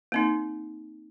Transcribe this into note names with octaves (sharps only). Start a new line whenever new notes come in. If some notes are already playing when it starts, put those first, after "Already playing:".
A#3 C4 D#4